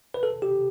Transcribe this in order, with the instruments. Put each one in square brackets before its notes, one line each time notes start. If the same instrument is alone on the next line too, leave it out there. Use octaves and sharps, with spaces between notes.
[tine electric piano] B4
A4
G4